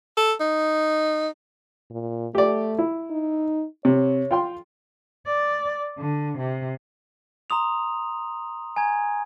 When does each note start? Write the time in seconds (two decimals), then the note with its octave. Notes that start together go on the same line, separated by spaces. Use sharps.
0.17 A4
0.40 D#4
1.90 A#2
2.35 A3 G4 D5
2.78 E4
3.11 D#4
3.85 C3 C#5
4.31 F4 G5 C6
5.26 D5
5.98 D3
6.38 C3
7.50 A#5 C6 D#6 F7
8.76 G#5 A#5 G#6